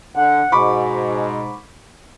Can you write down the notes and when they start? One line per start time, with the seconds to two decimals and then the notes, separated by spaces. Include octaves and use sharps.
0.15 D3 F#5
0.52 G#2 B2 B5 C#6 D6